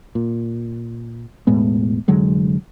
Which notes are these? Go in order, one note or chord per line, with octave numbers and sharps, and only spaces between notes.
A#2
E1 A2 G#3 B3
F1 D3 F#3 G#3